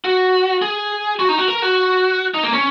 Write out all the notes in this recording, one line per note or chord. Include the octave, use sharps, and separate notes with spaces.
F#4
G#4
F#4
D#4
F#4
A#4
F#4
D#4
A#3
C#4